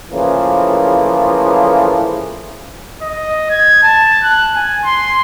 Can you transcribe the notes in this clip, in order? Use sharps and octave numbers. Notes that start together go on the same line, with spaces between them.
C#3 E3 F3 A3 A#3
D#5
G#6
A5
F#6
G#5
C6